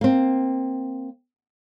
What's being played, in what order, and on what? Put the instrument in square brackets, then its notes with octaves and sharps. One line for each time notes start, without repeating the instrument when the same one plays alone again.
[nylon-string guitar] A#3 C4